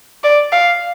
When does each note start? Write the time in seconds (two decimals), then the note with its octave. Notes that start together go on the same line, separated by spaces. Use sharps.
0.24 D5
0.52 F5